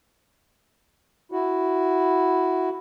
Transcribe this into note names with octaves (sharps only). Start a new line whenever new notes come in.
E4 F#4